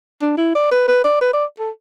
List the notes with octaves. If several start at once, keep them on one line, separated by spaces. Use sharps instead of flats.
D4
E4
D5
B4
B4
D5
B4
D5
A4